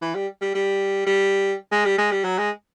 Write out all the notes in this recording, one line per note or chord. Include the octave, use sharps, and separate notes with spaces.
E3
G3
G3
G3
G3
G#3
G3
G#3
G3
F#3
G#3